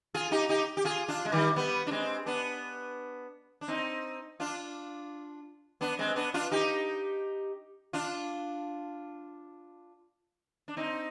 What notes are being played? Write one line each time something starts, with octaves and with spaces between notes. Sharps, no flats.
F4 G#4
D#4 G4
D#4 G4
G4
F4 G#4
D4 F4
G#3
D#3 G3
G3 B3
D4
G#3 C4
B3 D4
D4
C4 D#4
D4 F4
B3 D4
G#3 C4
B3 D4
D4 F4
D#4 G4
D4 F4
D4
C4 D#4